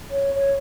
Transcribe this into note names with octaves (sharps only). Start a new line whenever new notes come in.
C#5
C#5